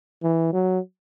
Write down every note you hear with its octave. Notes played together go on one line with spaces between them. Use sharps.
E3
F#3